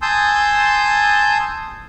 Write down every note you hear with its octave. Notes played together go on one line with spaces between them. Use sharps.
G#5 A5 C6 D#6 E6 G6